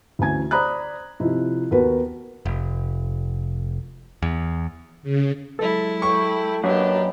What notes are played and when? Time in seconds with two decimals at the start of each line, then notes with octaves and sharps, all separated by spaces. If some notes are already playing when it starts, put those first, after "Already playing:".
0.19 D2 E3 C#4 G#5 G#6
0.51 C5 D5 A#5 B5 D#6 F#6
1.20 C3 F3 D#4 E4
1.71 D#2 B3 F#4 A#4 B4
2.45 F1
4.22 E2
5.03 C#3
5.59 F#3 G#3 E4 A4
6.02 A4 G5 C#6
6.64 F#2 A#3 D4 G4 B4 D#5